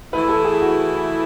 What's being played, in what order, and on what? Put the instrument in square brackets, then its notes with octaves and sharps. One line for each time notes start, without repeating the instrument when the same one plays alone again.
[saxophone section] E3 A3 E4 [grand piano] B4
[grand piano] A4
G#4
F#4